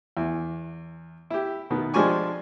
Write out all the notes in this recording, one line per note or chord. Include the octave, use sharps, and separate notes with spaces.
E2
E4 G4
B2 D#3 B3
F3 G#3 D4 G4 G#5 C#6